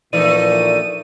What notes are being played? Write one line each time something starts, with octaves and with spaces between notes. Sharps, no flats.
A#1 A#2 E3 A3 D#4 D5 D#7